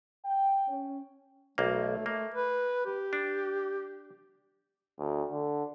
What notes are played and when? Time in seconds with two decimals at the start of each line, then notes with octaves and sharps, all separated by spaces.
0.25 G5
0.68 C#4
1.58 B1 A3 A#3
2.06 A3 A#3
2.34 B4
2.86 G4
3.13 D4
4.99 D2
5.31 D3